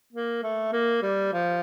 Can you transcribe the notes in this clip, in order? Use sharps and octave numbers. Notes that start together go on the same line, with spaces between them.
A#3
A3
A#3
G3
F3